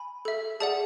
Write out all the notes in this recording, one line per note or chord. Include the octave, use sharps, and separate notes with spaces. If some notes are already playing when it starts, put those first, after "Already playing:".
Already playing: G#5 B5
A4 E5
G#4 D5 F#5 A5